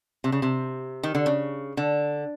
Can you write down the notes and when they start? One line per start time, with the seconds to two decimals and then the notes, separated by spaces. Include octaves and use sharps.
0.24 C3
0.32 C#3
0.42 C3
1.03 D#3
1.15 D3
1.26 C#3
1.77 D3